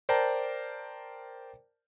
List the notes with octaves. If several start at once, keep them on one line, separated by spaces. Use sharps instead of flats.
A#4 C5 D5 G5 A5 A#5